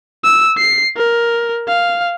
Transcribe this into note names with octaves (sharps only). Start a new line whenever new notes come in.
E6
C7
A#4
F5